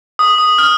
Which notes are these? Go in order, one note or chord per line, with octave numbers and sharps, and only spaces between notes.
D#6
D#6
F6